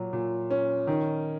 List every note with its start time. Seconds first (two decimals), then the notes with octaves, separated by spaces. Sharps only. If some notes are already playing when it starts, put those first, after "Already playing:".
Already playing: A#2 F#3
0.13 A#2
0.51 C#4
0.87 D#3